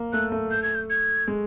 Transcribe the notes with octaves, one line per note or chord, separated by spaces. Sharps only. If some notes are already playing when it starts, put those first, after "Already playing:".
Already playing: A#3
A3 F#6
A3
G6
G#6
G6
G#6
G#3